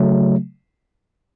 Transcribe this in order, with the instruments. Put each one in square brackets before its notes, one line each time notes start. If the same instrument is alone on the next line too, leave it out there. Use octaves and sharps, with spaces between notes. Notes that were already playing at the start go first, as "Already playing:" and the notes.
Already playing: [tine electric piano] C#3 F#3 A3